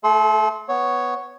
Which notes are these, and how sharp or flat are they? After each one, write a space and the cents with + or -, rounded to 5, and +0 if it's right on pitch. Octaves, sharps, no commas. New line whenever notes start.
A3 +0 A4 -40 C6 +0
B3 +0 C#5 +0